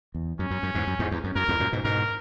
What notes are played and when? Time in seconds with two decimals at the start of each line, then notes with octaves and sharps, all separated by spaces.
0.14 E2
0.39 F#2 C#4
0.51 F#2
0.63 F#2
0.75 E2 G#2
0.87 F#2
0.99 E2 G#2
1.11 E2
1.24 F#2
1.35 F#2 A#4
1.48 E2 G#2
1.60 F#2 A#2
1.73 G#2 B2
1.84 G#2 B2 A#4